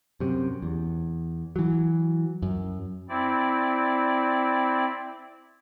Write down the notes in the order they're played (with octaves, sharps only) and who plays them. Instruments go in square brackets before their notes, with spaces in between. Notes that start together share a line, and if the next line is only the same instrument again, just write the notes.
[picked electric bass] F#2 C3
E2
E3 F#3
F#2
[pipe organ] C4 E4 D5